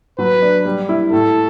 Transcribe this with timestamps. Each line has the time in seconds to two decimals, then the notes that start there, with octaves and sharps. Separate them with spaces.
0.18 F#3 B4
0.42 D4
0.65 G3
0.89 E4
1.12 A2 A4